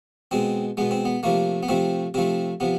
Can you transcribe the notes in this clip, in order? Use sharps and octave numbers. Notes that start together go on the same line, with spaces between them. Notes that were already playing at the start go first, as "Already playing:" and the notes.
B2 G#3 C4
B2 G#3 B3
C4
B3
C3 F3 A3 A#3
B3
C3 F3 A3 C4
C3 F3 A3 C4
C3 F3 B3